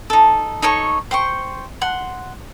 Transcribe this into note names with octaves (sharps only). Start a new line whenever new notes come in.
D#4 A4
D#4 A4 C#5 C#6
C5 G5 C6 C#6
F#5 C6